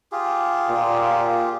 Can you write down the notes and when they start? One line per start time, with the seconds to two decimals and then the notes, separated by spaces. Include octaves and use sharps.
0.12 F4 G4 G#4
0.69 A#2